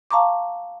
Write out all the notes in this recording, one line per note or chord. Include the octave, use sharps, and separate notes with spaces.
F5 A5 A#5 C#6 D6